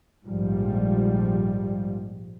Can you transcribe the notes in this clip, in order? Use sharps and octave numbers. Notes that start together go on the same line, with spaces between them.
A#1 G#2 F3 G3